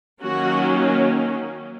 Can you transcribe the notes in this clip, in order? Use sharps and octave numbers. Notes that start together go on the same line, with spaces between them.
D#3 F#3 A#3 C#4 F#4